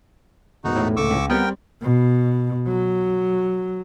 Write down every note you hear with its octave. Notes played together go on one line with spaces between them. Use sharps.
E1 G#2 B2 D#4 F#4
A2
C#2 A3 C#6 D6 E6
C#2
G3 B3 C4 A#4 G5
B2
F#3